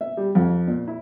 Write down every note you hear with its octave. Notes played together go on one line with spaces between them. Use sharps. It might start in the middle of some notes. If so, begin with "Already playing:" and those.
E5
G3
F2
A#2
E4